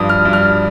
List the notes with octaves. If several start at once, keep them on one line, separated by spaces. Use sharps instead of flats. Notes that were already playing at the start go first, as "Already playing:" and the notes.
Already playing: G2 F3 D#6
F6
G2
F6